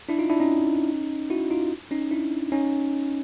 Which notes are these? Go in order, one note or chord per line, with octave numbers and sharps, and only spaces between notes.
D4 E4
D#4 F4
D4 E4
C#4 D#4
E4 F#4
D#4 F4
C#4 D#4
D4 E4
C#4 D#4